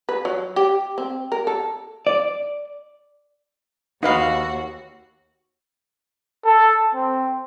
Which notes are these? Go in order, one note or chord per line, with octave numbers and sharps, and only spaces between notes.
B4
F#3
G4
C4
A#4
A4
D5
D#2 D#4 F#4 B4 F5
A4
C4